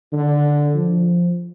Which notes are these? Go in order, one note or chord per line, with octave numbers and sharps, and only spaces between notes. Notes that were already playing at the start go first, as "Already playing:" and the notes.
D3
F3